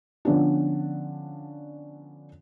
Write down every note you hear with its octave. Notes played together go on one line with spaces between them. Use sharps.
D3 F3 B3 C#4 D4